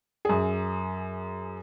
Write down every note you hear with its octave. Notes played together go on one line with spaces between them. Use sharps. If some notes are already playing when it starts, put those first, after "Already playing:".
F#2 G#4